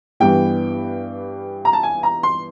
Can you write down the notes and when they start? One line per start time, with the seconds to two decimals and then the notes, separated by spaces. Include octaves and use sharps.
0.20 G2 E3 G3 B3 G5
1.65 A#5
1.73 A5
1.83 G#5
2.03 A#5
2.23 C6